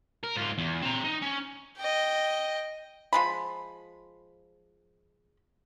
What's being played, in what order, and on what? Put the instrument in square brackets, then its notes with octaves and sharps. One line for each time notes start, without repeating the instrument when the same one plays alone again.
[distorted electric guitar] A#4
G#2 F4
E2
C4 A#5
D#4
C#4
[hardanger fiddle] D#5 G5
[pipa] F3 G#3 B5